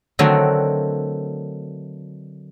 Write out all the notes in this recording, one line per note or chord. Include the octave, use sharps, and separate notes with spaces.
D3 D#3 F#3 A3 C4